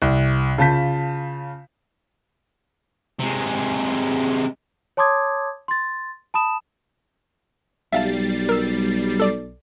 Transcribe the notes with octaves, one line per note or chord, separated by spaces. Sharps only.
C2
C#3 F4 A5 G6 B6
C3 G#3
C#5 A5 C6 D6 D#6 G#6
C6 A6
A5 B5 D#6 E7
B1 G3 E5 F5 A5 A6 C7
A#4 E6
A4 D5 D6